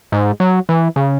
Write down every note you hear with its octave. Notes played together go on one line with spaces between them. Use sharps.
G#2
F#3
E3
C#3